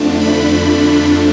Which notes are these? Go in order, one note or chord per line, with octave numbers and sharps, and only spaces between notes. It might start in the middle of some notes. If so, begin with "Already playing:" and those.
Already playing: F2 D3 F3 A3 D4
B5